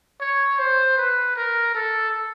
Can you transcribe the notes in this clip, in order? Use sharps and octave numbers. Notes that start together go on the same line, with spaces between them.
C#5
C5
B4
A#4
A4